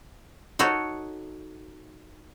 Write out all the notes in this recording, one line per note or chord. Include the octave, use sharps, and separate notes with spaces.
D#4 F#4 A4 C#5